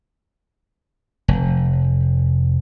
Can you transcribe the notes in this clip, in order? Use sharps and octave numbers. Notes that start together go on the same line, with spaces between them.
F1